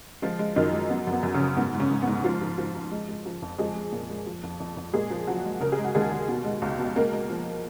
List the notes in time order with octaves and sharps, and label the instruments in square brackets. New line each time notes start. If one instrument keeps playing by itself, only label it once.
[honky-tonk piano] F3 G#3 F4
G#3
F#2 D#3 D#4
G#3
F#3 B3
F#2
B3
F#2
C#3 C#4
F#2
G#2 B3
G#2
C#3 C#4
G#2
B3
G#2
F3 F4
F3
F3
F3
G#3
G#3
F3
F2
F3 G#3 G#4
G#3
A#2
G#3
F3
F2
F2
F2
A#2 G#3 G#4
F3
F3 F#3 F#4
G#3
C#3 A#4
G#4
G#3
F#4
D#2 G#3 G#4
D#2
B2
G#3
C#2
B2
G#3 A#3 A#4
G#3
F3